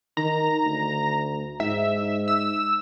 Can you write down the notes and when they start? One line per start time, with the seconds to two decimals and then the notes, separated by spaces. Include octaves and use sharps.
0.17 D#3 A#5
0.65 D2
1.60 G#2 E5
2.28 E6